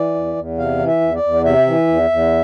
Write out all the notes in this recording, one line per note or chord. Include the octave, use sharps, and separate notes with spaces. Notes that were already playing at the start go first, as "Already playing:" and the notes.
Already playing: E3 D5
E2
E2
C3 F5
E3
E5
E2
D5
E2
C3 E5
E3
E2
E2